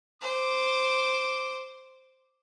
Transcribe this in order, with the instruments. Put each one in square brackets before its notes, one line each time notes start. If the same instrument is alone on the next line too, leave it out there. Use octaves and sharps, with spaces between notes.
[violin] C5 [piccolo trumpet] D6